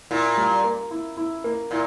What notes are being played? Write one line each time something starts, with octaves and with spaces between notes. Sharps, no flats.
A#2 E4
G3
A#3
E4
E4
A#3
A#2 E4